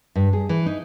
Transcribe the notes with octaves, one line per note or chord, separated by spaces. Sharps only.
G2
G#4
E3
D#4